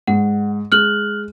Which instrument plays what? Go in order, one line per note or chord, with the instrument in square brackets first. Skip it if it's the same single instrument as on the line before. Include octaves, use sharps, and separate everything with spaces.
[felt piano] G#2 [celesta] F#5
[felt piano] G#3 [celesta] F6 F#6 F#7